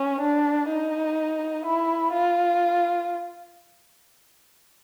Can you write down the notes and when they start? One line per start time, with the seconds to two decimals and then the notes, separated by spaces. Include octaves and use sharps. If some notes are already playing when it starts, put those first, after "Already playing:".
Already playing: C#4
0.21 D4
0.69 D#4
1.65 E4
2.13 F4